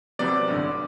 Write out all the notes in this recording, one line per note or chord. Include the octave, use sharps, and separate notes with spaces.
C2 C3 F#3 B3 D5
A1 G2 D3